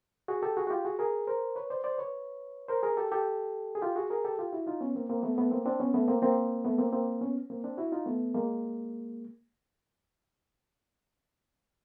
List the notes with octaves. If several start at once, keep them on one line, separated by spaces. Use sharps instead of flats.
F#4 G#4
G4 A4
F#4 G#4
F#4
F4 G4
F#4 G#4
G#4 A#4
A#4 C5
B4 C#5
C5 D5
C5 D5
B4 C#5
A#4 C5
G#4 A#4
G4 A4
G4 A4
G#4
F4 G4
F#4 G#4
G#4 A#4
G4 A4
F4 G4
E4 F#4
D#4 F4
B3 C#4
A#3 C4
A#3 C4
A3 B3
A3 B3
A#3 C4
C4 D4
B3 C#4
A3 B3
A#3 C4
A#3 C4
A3 B3
A#3 C4
A#3 C4
B3 C#4
A#3 C4
C4 D4
E4 F#4
D#4 F4
A3 B3
G#3 A#3